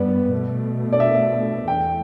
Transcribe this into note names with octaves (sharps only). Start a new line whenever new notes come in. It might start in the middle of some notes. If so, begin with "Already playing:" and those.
Already playing: G2 G3 B3 B4 D5
B2 A3
D5
E5
E2 E3 A3 G5